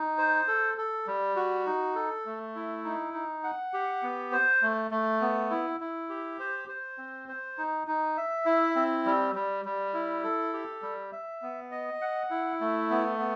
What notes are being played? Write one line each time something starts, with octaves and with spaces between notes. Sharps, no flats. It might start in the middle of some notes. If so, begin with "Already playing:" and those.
Already playing: D#4
C5
A4
A4
G3
F#4
D#4
A4
A3
E4
D#4
D#4
F#5
G4
B3
C5
A3
A3
B3
E4
E4
G4
C5
C5
C4
C5
D#4
D#4
E5
E4
C4
G3
G3
G3
E4
A4
G4
G3
E5
B3
D#5
F#5
E4
A3
B3
B3